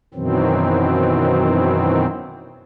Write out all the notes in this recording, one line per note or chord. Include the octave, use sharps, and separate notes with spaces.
F#2 B2 D#3 E3 F#3 C4